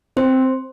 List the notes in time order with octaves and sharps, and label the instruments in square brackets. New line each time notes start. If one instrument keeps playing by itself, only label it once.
[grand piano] C4 [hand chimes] C5